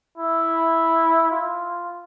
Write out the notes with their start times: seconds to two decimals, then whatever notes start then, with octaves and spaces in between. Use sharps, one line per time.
0.17 E4
1.31 F4